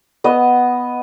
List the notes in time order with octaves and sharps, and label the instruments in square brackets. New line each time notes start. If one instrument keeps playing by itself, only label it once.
[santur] B3 D#5